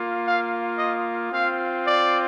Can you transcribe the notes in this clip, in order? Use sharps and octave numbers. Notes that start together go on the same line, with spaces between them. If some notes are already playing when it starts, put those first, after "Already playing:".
Already playing: A#3 F4
F5
D#5
C4 F4 F5
D5